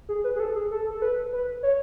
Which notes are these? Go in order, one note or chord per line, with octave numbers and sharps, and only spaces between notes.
G#4
B4
G#4
A4
G#4
A4
A4
B4
B4
C#5